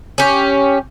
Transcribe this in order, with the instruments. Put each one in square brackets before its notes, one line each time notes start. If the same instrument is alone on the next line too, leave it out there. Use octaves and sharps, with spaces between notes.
[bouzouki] C#4 G4